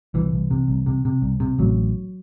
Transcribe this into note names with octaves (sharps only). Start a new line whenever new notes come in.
C2 E3
C2
C3
C2
C3
C3
C2
C3
A1 F#3